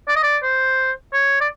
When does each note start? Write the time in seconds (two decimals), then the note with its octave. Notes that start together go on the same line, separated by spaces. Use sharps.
0.08 D5
0.16 D#5
0.23 D5
0.43 C5
1.13 C#5
1.41 D5